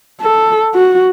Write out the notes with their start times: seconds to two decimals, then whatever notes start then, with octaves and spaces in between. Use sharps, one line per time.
0.21 A4
0.74 F#4